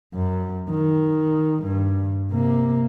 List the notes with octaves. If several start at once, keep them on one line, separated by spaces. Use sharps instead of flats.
F#2
D#3
G2
C3 A#3